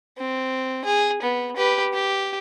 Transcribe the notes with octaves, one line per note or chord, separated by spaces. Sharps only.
C4
G#4
B3
G4 B4
G4